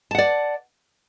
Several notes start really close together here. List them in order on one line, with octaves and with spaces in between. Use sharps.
A5 F#5 D5